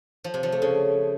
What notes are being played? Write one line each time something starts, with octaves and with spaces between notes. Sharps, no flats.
F3
C3
F3
A3
C#3